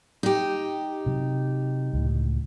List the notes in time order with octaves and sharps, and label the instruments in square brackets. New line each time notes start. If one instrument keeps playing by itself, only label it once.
[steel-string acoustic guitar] D#4 G4
[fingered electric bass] C3 F#3
C#2 A2